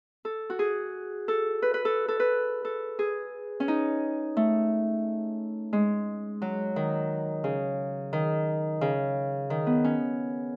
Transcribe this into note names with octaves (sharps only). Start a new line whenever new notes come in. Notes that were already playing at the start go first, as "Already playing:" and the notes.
A4
F#4
G#4
A4
B4
B4
A4
A4
B4
A4
G#4
C#4
D#4
A3
G#3
F#3
D#3
C#3
D#3
C#3
D#3
B3
C#4